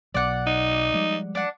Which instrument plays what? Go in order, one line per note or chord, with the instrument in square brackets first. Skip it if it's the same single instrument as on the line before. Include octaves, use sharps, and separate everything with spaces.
[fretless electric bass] B1 B2 F#3 [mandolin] D5 F#5
[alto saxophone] D#4
[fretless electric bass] F3 G3 G#3
[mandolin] D4 F#5